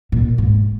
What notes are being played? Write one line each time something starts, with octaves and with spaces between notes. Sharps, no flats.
A#2
G#2